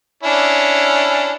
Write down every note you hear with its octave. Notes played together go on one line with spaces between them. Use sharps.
C#4 D4 E4